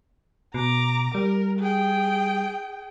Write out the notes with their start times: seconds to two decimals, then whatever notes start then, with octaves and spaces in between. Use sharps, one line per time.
0.54 B2 A#5 D6
1.15 G3 A#4
1.59 G#4 G5